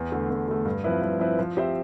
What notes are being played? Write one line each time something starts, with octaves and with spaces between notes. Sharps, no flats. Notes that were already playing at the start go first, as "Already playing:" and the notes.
Already playing: E2
D3 A3
E2
D3 A3
G2
F3 C4 E4 B4
G2
F3 C4 E4 B4
F3
C4 G4 C5 E5